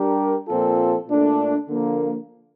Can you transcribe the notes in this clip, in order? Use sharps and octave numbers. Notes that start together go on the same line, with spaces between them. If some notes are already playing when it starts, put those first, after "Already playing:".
Already playing: G3 D4 G4 A#4
A#2 F3 C4 F4 A4
A#2 A3 D4 A4
D3 F3 A#3